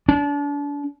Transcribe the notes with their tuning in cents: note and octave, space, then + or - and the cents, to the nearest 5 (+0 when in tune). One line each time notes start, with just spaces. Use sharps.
D4 -35